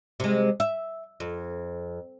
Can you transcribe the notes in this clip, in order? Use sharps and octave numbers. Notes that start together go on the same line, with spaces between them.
C3 G#3
E5
F2